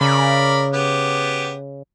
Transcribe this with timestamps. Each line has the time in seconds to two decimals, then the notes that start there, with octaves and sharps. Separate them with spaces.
0.01 C#3 A#4 D5 B5
0.74 B3 G4